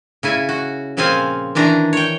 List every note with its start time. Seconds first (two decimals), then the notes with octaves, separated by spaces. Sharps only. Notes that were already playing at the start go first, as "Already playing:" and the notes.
0.23 C#3 E4 G#5
0.49 F#4
0.97 A#2 C#3 F3 C4 F5 G#5
1.55 D#3 E3 D4 A#5
1.93 C#5 G5